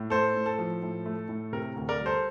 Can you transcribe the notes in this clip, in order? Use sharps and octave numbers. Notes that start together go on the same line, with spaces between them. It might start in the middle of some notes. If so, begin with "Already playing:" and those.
Already playing: A2
A3 A4 C5
A2
A4
F3
A2
A3
A2
C3 A#4
D2
A#4 D5
G3
A4 C5